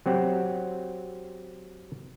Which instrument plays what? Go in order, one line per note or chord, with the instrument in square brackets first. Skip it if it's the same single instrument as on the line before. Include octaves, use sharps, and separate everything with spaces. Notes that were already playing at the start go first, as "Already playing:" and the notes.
[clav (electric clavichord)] F#3 C4 G4 F#5